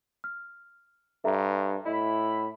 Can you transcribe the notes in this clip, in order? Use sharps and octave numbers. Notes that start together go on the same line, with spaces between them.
F6
G2 A4 E5 A#5
A2 E4 D#5 B5